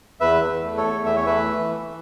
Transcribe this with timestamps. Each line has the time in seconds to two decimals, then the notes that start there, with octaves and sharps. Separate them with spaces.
0.20 E2 B4 E5
0.42 E2
0.64 A3
0.77 A4 C#5
0.85 E2
1.06 E3 E5
1.16 C#5
1.26 A3 B4 E5
1.48 E3
1.69 E3